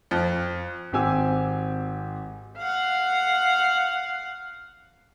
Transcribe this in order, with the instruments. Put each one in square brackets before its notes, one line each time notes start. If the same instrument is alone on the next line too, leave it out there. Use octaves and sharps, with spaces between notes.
[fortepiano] F2
[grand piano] G#1 C4 G4 G#5 E6
[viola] F5 F#5